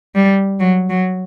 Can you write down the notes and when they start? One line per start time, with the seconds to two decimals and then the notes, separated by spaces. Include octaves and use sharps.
0.15 G3
0.60 F#3
0.90 F#3